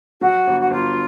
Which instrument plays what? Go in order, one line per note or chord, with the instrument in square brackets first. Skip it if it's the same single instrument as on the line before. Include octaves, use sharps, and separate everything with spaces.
[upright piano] F#3 [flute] F#4
[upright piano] G1
[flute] F#4
[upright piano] G1 [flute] F4